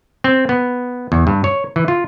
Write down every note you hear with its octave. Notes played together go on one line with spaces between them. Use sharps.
C4
B3
E2
G2
C#5
E3
F4